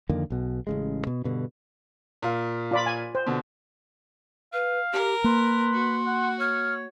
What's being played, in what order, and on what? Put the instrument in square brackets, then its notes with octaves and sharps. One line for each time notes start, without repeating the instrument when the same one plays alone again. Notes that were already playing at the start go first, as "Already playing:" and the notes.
[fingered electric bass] F2 D3 D#3 A#3
B1 B2
A1 C#3 G#3
B2
G2 B2 D3
[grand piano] A#2 F5
[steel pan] F4 D5 B5
G#5
C5
[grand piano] B2 D3
[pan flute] B4 [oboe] F5
[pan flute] G4 [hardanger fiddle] A#4
[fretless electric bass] A#3 [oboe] B4 [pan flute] C6
[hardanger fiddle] F#4
[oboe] F#5
[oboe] C#5 [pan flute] F6